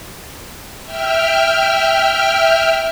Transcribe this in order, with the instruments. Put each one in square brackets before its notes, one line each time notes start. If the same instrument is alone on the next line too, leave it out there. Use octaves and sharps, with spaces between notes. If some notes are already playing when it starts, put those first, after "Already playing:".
[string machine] E5 G5 F6